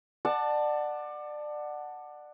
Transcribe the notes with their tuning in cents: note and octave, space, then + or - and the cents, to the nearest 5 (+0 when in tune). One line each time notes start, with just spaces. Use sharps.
D5 +25 F#5 +0 A5 +0